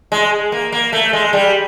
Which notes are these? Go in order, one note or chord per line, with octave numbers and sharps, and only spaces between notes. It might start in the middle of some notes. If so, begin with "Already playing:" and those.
G#3
A#3
A#3
A3
G#3
G3